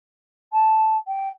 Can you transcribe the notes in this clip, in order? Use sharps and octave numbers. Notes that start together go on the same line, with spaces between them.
A5
G5